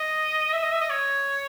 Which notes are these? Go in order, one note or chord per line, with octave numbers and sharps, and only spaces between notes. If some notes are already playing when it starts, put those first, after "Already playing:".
Already playing: D#5
E5
D#5
E5
D#5
C#5